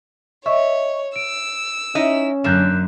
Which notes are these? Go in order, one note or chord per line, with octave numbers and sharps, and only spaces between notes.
C#5 D#5 E5 C#6
E6 D7
C#4 D#4 E4 D#5
F#2 D3 A#3 F#6 G6 E7